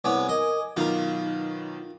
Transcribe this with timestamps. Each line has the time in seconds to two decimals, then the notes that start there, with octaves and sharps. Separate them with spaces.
0.04 C2 B3 C#5 G#5 D6
0.29 A#4 D#5
0.77 B2 D#3 F#3 D#4 F4 A#4